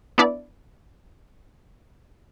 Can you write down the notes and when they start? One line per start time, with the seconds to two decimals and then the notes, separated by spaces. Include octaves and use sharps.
0.18 B3 D4 E4 D5